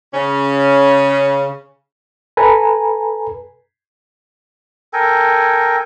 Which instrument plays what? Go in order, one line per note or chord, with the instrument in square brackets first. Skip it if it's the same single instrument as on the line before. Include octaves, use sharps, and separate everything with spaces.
[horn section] C#3 C#4
[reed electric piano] A4 B4 G#5 A#5
[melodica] A4 A#4 G5 G#5